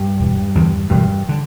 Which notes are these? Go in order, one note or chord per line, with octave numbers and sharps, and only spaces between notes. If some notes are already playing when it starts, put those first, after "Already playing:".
Already playing: G2
E1
E2 D3
E1 G2
D3